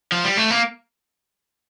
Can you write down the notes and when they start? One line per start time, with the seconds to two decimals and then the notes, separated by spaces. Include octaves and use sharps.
0.12 F3
0.24 G3
0.37 A3
0.51 A#3